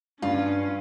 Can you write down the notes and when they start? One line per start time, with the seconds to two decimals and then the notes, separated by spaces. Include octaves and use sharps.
0.22 G2 C#4 F4